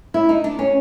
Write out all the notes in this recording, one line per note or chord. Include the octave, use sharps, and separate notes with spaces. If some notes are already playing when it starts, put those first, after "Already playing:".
E4
D#4
D4
C#4